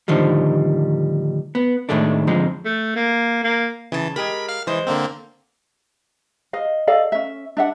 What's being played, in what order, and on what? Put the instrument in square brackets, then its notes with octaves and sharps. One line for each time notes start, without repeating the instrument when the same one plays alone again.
[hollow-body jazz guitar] A2 D3 D#3 F3 G3
B3
A2 D#3 G#3 A3 D4
F2 G#2 D3 F3 G#3
[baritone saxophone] A3
A#3
A#3
[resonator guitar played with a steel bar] C#3 A5 [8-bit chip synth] E3
[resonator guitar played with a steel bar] G#3 G4 A#4 [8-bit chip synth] B5
[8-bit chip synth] F5 F6
[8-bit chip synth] E3 [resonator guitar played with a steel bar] G#3 C5
[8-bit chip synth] D3 A#3 C4
[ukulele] D#5 F5
A4 D5 D#5 F5
C#4 E5
D4 E5 F#5